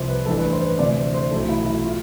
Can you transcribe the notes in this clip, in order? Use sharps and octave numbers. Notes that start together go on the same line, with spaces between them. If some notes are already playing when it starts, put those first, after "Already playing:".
Already playing: C2 C3 F3 C5
B4
A1 G2 E3 A4
B4
C5
B4
D2 C3 E3 D5
C5
C5
B1 A2 E3 A4
E4
E4
F4